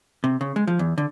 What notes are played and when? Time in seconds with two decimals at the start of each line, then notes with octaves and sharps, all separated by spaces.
0.24 C3
0.41 C#3
0.56 G#3
0.67 F3
0.79 E2
0.98 D3